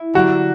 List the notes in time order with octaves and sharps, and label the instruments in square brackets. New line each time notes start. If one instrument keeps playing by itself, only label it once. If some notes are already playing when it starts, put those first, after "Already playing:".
Already playing: [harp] E4
[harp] D3 F#3 A#3 D4 G4 [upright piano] F#4